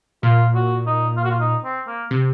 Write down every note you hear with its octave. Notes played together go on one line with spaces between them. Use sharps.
A#2 F4
F#4
D#4
F4
F#4
F4
D#4
C4
A#3
C3